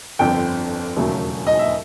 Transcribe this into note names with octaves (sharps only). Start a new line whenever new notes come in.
G1 F2 D3 F3 G5
E1 D#2 C#3 F#3 A3
D#5
E5